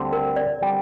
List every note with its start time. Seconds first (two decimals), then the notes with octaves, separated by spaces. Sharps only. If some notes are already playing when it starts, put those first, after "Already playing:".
Already playing: D2 D3 G3 C4 G4
0.13 A#4
0.36 D5
0.61 D3 G3 C4 G4